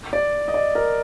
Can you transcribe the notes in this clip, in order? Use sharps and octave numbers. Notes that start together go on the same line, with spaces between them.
D5
D#5
D5
A#4